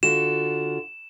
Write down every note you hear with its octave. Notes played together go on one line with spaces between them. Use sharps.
D3 F4 F#4 E7